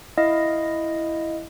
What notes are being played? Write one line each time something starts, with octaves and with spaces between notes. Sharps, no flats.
E4 D#5 F5